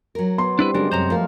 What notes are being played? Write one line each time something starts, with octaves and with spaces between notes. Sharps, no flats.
F#3 A#4
B3 C6
G3 C4 D4 E4 B4
C#3 F#3 G#3 D4 G4 A#4
F#2 C3 C5 A#5
F3 A3 F4 A#4